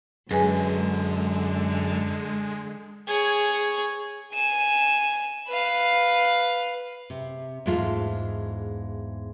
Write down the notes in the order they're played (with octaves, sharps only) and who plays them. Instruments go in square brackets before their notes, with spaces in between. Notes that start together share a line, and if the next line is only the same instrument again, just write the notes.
[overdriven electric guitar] F#2 [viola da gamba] D3 [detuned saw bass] G#3 [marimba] G#4 B4 G#5
[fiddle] G#4 C#5
[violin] G#5 E7
B4 F5
[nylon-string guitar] C3
E2 G#2 G#3 A3 F4